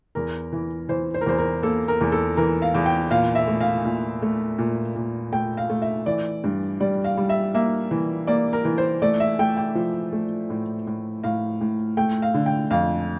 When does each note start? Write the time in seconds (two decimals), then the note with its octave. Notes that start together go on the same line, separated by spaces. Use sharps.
0.15 E2 A#4
0.53 E3
0.89 E3 C5
1.14 C5
1.21 A#4
1.26 E2 C5
1.38 A#4
1.63 A#3 A4
1.88 A#4
2.01 E2
2.12 A4
2.37 E3 A#4
2.62 F5
2.75 E2
2.86 G5
3.10 A#2 F5
3.35 E5
3.47 A3
3.60 F5
3.85 A#2
4.22 A3
4.58 A#2
4.96 A#2
5.32 A3 G5
5.57 F5
5.70 A3
5.82 E5
6.06 E3 D5
6.44 G2
6.80 G3 D5
7.04 F5
7.17 G3
7.29 E5
7.54 A#3 E5
7.91 E3
8.27 A#3 D5
8.53 A#4
8.65 E3
8.78 C5
9.02 A3 D5
9.20 E5
9.39 A3 G5
9.57 G5
9.75 F3
10.13 A3
10.50 A2
10.87 A2
11.23 A2 F5
11.61 A2
11.97 A3 G5
12.22 F5
12.34 D3
12.46 G5
12.71 F2 F5